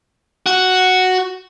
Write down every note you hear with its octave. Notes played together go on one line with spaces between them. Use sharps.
F#4